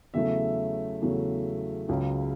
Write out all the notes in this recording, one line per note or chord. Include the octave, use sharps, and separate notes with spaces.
E2 C#3 F#3 A3 E5
E2 C#3 F#3 A3
C#2 C#3 F#3